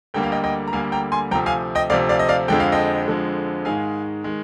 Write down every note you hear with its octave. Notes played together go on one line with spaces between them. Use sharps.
D2 D3 G3 A#3 G5
F5
D#5 G5
D#5 G5
A#5
D2 D3 G3 A#3 F5 G#5
G5 A#5
G#5 C6
D2 C3 F3 G5 A#5
F5 G#5
D#5 G5
D2 C3 F3 D5 F5
D5 F5
D#5
D5 F5
F2 D3 F3 G#3 G5
F5
D#5 G5
F2 D3 F3 G#3
G#2 D#3 G#3 F5 G#5
D#3 G#3